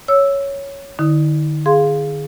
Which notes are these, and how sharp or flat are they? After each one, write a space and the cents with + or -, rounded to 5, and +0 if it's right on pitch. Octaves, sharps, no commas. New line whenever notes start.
C#5 +0 E6 +0
D3 +40 E4 -40 D#6 +0
G#4 +0 F5 +0 C6 +0